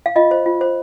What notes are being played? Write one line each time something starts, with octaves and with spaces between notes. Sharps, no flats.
F5
F4 D#5
C5
F4
C5